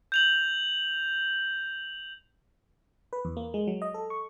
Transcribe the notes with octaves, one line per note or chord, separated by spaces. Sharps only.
G6 F7 F#7
B4
E2
A#3
G#3
F#3
D#5
A4
C#6